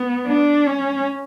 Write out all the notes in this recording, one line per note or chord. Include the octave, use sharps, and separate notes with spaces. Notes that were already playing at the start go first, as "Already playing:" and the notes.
Already playing: B3
D4
C#4